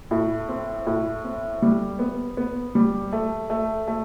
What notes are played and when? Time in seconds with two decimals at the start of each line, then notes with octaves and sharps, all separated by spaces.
0.11 A2
0.49 C4
0.86 A2
1.24 C4
1.62 G3
1.99 B3
2.37 B3
2.75 G3
3.13 A3
3.50 A3
3.88 A3